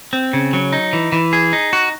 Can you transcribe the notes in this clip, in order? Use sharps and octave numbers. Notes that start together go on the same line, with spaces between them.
C4
C#3
F#3
D#4
E3
E3
G#4
D#4
F#4